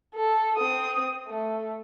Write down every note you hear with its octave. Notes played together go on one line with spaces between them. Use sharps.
A4
C4 D#6
A3